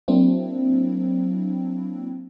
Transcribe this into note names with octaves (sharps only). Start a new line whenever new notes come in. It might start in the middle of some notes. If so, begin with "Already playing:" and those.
F#3 A#3 C4 D4 E4